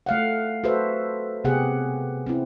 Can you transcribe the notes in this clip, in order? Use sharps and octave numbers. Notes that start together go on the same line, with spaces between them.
A3 F5 F#5
F#4 A4 B4 C5 E5
C3 B3 G4 G#4 F#5
C4 E4